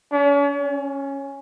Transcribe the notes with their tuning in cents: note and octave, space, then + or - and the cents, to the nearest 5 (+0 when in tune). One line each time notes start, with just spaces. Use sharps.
C#4 +45
C#4 -5